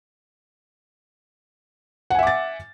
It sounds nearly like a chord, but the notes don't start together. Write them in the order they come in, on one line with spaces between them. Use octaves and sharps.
F#5 G#5 E5 D6 A6